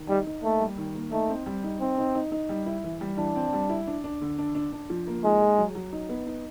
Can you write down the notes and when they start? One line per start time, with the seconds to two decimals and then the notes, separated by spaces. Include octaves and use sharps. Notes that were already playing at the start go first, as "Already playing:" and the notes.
Already playing: D#3
0.09 G3 D#4
0.27 D#4
0.43 A3 A#3
0.60 G3
0.78 D#3
0.95 A#3
1.12 A3 D#4
1.29 C4
1.46 G3
1.64 D#4
1.81 C4 D#4
1.98 D#4
2.15 D#4
2.32 D#4
2.49 G3
2.66 E4
2.84 E3
3.01 G3
3.18 E3 D4
3.36 C4
3.53 G3
3.69 E4
3.87 D4
4.04 D4
4.21 D3
4.38 D4
4.55 D4
4.73 D4
4.90 F3
5.07 A#3
5.24 G#3 D#4
5.42 G#4
5.58 F#3
5.75 F#3
5.93 D#4
6.09 B3
6.27 D#4